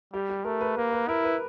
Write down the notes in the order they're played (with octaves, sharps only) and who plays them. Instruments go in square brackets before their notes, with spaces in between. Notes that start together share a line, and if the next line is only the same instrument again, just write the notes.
[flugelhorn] G3 [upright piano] G4
[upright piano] G4
[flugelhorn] A3 [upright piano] A#4
[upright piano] B4
[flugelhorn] A#3 [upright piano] B4
[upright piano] B4
[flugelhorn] E4 [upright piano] A#4
[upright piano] B4